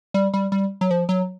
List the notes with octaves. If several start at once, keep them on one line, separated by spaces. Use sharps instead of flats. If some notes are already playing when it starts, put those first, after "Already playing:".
G3
G3
G3
F#3
F3
F#3